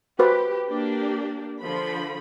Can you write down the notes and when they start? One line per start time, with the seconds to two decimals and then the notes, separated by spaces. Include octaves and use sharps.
0.19 F#4 G4 B4 C5
0.67 A#3 D4 G4
1.60 D3 F3 B5